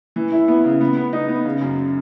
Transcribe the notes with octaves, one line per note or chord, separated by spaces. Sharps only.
E3
E4
B3
C#3
B3
B3
D#4
B3
C#3
F#2